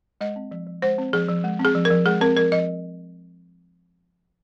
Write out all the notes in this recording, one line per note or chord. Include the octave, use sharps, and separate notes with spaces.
G#3 D#5
C4
F3
F3
G#3 C5
C4
F3 G#4
F3
G#3
C4
G#4
F3
A#4
F3
G#3 G#4
C4 A#4
F3 A#4
F3 D#5